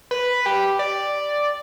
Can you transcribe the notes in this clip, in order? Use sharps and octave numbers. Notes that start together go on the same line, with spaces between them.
B4
G4
D5